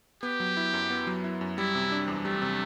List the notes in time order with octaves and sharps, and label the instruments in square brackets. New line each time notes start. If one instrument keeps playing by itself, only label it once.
[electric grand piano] B3 [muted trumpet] G4
[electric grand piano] F#3
E4
F#2
B3
F#3
E4
F#2
[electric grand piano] G3 [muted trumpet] E4
[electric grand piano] C3
D4
E2
[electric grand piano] G3 [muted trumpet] A3
[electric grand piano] C3